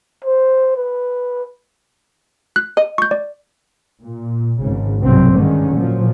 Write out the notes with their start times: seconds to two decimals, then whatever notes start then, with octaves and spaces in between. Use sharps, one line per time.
0.25 C5
0.76 B4
2.56 F#6
2.77 D#5
2.98 C#6 G6
3.11 D5
4.03 A#2
4.62 G#1 C#3
4.99 B1 G2 C3 F#3 C4
5.33 G2 D3 D#3 G#3 C#4
5.74 A#2 F3 F#3